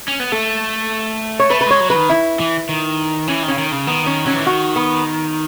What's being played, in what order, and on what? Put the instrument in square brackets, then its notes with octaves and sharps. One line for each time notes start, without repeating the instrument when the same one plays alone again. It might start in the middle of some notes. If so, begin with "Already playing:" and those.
[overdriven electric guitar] C#4
B3
[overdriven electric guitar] A3 [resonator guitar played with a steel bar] A4
[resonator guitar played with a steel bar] C#5
[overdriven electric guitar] A3 [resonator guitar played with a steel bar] B4
[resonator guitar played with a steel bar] B4
[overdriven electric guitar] G#3 [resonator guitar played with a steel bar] C#5
[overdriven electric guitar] F#3
[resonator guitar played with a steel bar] B4
[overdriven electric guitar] D#3
[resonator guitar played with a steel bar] E4
[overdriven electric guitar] E3
D#3
[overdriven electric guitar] E3 [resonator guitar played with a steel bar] C#4
[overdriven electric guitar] D#3
[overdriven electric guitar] C#3 [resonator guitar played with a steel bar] C#4
[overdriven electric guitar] D#3
C#3
[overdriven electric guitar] D#3 [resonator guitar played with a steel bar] B3
[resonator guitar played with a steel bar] C#4
[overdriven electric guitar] F#3 [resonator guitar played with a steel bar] C#4
[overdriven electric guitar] E3
[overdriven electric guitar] D#3 [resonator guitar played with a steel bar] F#4
[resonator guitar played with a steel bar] B3